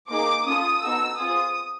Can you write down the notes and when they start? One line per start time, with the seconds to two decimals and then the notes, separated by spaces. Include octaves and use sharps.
0.10 A#3 D#4 G#4 D6
0.46 C#4 F4 A4 D#6
0.82 B3 D#4 F#4 A4 E6
1.17 C4 F4 G#4 D#6